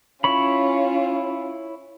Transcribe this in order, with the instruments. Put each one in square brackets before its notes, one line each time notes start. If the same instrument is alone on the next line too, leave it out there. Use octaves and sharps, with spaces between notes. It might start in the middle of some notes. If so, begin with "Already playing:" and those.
[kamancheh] C#4 F4 [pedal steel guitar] E4 C#5 B5